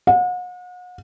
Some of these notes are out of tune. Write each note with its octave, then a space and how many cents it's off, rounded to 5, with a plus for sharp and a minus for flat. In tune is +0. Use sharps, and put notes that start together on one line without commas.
F#5 -40